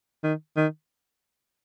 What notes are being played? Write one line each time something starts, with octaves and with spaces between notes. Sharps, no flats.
D#3
D#3